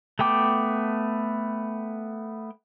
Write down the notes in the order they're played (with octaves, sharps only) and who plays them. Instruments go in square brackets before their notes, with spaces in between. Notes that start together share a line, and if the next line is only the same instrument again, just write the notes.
[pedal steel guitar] A3 B3 G5 D6